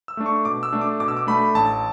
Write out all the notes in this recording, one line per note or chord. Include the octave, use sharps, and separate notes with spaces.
E6
A3 D4
C#6
B2 D6
E6
A3 D4
D6
B2 D6
E6
D6
A3 D4 B5
A1 A5